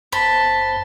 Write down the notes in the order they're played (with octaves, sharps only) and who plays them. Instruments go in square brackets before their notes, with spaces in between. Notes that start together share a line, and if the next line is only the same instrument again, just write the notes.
[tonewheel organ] F#1 F#2 C5 [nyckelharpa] A5 [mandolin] B5